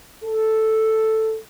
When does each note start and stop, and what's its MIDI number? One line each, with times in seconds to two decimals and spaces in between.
0.24 1.38 69